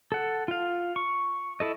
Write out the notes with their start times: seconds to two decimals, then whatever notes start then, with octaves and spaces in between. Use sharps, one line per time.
0.12 A4 F#5
0.48 F4 F5
0.96 C#6
1.60 E4 A4 D#5